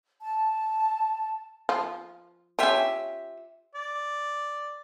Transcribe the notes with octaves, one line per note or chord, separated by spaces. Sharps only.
A5
F3
C#4 D4 F4 G4 E5
D5